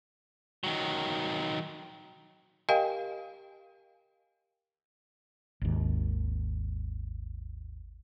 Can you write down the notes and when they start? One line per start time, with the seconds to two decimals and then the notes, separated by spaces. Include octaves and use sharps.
0.64 D#3 F#3
2.69 G4 A#4 D#5 F5 G5 G#5
5.61 G#1 D#2